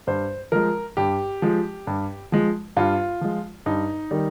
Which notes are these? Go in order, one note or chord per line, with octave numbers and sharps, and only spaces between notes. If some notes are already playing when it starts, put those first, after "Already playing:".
G2 C5
F3 G#3 A#4
G2 G4
F3 G#3
G2
F3 G#3
G2 F4
F3 G#3
G2 D#4
D#3 G3